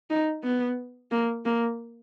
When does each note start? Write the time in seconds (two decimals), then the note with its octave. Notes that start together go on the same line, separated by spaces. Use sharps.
0.10 D#4
0.44 B3
1.11 A#3
1.45 A#3